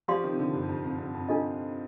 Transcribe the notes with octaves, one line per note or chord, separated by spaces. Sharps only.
F3 G4 D5 F5 C6
D#3
C3
D3
G2
F2
F2
F2
F2
D4 F4 A4 D#5